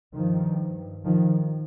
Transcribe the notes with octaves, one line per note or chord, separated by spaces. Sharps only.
G2 D#3 F3
D#3 F3